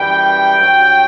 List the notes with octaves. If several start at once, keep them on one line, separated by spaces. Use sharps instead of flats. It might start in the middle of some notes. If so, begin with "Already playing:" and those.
Already playing: F#2 E3 G3 G5
G2 F#3